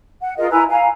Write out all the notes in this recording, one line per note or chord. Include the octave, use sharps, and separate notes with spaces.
F#5
F4 G#4 A#4 D#5
E4 B4 G#5 A#5
F5 G#5 A#5